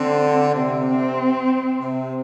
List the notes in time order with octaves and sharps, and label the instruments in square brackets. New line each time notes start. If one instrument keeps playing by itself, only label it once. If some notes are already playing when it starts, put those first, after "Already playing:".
Already playing: [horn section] D3 [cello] C4
[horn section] C3 [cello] C4
[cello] C4
[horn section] C3